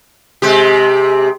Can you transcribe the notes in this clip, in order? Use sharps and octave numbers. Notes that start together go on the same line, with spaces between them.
C3 G#3 G4